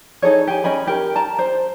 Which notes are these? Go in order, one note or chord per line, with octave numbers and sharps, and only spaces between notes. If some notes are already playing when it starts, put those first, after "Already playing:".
D#4 G#4 A4 C#5
G4 G#5
C#4 D#5 G#5 B5
G4 A#4
A5 A#5
C5